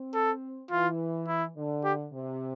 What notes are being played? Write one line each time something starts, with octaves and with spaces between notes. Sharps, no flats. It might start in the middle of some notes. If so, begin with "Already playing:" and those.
Already playing: C4
A4
E3 F4
E4
D3
G4
C3